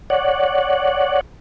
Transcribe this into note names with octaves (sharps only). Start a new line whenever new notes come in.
C#5 D5 F#5